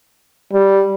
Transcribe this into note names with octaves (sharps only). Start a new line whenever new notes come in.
G3